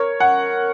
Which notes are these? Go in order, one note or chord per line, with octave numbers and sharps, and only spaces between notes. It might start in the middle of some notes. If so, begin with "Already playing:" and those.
Already playing: A#4 C#5
F#5